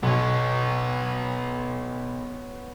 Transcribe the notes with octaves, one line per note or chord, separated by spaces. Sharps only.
B1 B3 C#5